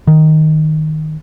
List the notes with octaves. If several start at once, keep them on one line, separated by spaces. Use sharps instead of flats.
D#3